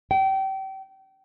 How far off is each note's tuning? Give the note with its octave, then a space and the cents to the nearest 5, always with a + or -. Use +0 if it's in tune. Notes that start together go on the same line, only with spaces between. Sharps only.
G5 -30